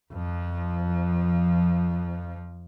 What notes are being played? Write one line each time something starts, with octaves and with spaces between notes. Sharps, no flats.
F2 F3